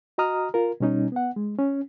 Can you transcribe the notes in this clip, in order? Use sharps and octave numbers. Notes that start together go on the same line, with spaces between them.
F#4 D#5 A#5 D#6 F6
F4 A#4
B2 G3 C#4 D#4
B3 F#5
G#3
C#4